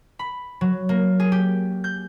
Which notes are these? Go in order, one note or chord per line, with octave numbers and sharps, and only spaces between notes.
B5
F#3
A#3
G#4
G4
G6